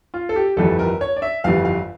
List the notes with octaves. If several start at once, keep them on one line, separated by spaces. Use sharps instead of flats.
F4
A4
G4
G1 F2 E3 G3 A4
A#4
C#5
D5
E5
G1 F2 E3 G3 F5
F5